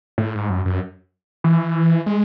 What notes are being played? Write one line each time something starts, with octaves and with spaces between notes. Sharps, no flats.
A2
G#2
F#2
F#2
E3
G#3